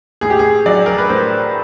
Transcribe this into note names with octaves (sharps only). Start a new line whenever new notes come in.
A2 G#4
G4
G#4
F#3 D5
A#4
B4
A2 C5